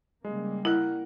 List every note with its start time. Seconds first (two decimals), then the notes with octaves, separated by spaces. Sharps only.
0.25 C#3 G3 G#3 A#3
0.65 E4 A#4 F#5 F#6